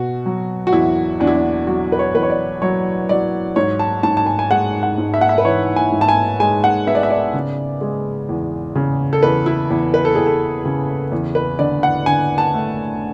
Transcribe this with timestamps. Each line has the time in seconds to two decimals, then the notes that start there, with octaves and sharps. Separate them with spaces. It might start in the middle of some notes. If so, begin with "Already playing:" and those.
Already playing: B2 F#4
0.26 F#3
0.67 F#4
0.72 E2 E4
1.20 E2 D4
1.27 E4
1.35 D4
1.67 F#3 F#4
1.92 B4
1.99 C#5
2.14 E2 B4
2.23 C#5
2.30 D5
2.62 F#3 C#5
3.09 F#3 D5
3.56 G#2 C#5
3.79 A5
4.03 G#2 A5
4.17 A5
4.26 G#5
4.39 G#5
4.51 G#3 F#5
4.83 F#5
4.98 G#2
5.14 E5
5.21 F#5
5.29 E5
5.38 B4
5.45 E3 C#5
5.76 G#5
5.92 G#2
6.01 A5
6.08 G#5
6.40 G#3 G#5
6.64 F#5
6.87 B3 E5
6.95 D5
7.03 E5
7.10 D5
7.34 C#3
7.81 G#3
8.29 E2
8.75 C#3
9.13 A4
9.23 E2 B4
9.46 E4
9.70 E2
9.94 B4
10.05 A4
10.15 E2 G#4
10.26 A4
10.65 C#3
11.12 E2
11.35 B4
11.59 D3 D5
11.83 F#5
12.06 D3 G#5
12.38 A5
12.54 A3